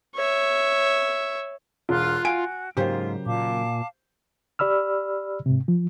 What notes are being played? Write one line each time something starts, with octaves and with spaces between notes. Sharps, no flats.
C#5 E5
E1 F4 C6 F6 F#6
F#4 G#5 D7
G#2 C#3 F#3 A#3 F4 G4 C5
A#2 F5 A5 D6
G4 D5 B5 E6 F6
G#2 C3
F3